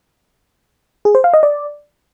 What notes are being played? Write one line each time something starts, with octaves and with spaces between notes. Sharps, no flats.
G#4
C5
F5
D#5
D5